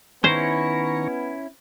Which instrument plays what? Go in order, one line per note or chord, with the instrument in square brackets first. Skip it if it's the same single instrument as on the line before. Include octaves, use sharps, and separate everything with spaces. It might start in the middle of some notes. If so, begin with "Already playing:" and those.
[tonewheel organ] D#3 A#5 C#6 [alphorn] B3 [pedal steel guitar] C#4 E4 [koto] C5